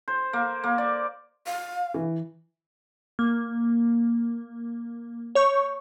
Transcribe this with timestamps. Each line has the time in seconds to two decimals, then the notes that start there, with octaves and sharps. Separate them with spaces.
0.08 C5
0.33 A#3
0.64 A#3
0.78 D5
1.47 F5
1.94 E3
3.19 A#3
5.35 C#5 C#6 G6